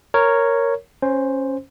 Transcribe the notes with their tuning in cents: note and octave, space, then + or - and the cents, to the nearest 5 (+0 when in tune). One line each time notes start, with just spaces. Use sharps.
A#4 -5 C#5 +0
C#4 -15 C5 +0